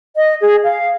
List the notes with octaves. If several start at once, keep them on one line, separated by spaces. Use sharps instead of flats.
D#5
G#4
F5